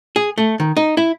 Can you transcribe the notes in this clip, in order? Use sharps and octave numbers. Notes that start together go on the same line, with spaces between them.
G#4
A3
D#3
D#4
E4